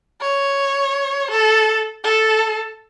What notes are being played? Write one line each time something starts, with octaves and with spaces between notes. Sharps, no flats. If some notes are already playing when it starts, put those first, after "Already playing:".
C#5
A4
A4